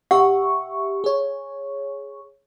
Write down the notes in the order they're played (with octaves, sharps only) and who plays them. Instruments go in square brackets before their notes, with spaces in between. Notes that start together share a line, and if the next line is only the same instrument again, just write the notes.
[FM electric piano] G4 E5 C#6 [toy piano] F#5
[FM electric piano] G#4 C#5